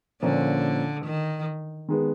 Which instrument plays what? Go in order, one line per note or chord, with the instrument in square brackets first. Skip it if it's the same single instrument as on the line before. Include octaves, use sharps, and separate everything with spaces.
[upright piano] A#2 F3 A#3 C#4 [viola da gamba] D3
[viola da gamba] D#3
[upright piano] D#3 G#3 B3